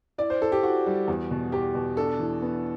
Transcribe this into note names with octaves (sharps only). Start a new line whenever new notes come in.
E4 D5
C5
E4 A4
G4
E4 F#4
G3
E2
B2
E2 G4
B2
D4 A4
E3
B3